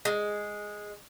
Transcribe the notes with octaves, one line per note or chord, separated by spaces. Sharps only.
G#3